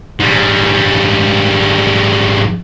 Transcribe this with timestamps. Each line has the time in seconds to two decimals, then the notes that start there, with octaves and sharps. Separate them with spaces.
0.20 G#2 G3